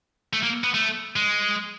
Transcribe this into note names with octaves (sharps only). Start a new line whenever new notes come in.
A3
A#3
B3
A3
G#3